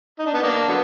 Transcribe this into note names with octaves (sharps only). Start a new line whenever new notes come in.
D#4
D4
B3 D#4
A#3 D4
D3 F#3 B3